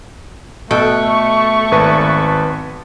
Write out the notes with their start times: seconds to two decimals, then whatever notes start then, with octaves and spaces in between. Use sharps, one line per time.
0.71 B2 A3 A4 G5 C#6
1.72 G#1 B4 A5